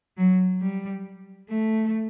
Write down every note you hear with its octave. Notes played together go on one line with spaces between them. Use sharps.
F#3
G3
A3